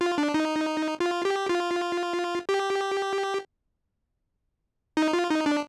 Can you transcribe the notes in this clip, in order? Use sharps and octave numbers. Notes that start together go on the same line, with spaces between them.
F4
D4
D#4
F4
G4
F4
G4
D#4
F4
D#4
D4